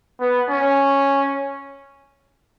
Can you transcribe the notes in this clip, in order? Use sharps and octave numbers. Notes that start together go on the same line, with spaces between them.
B3
C#4